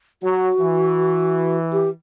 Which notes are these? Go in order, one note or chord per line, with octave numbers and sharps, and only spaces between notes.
F#3 F#4
E3
G4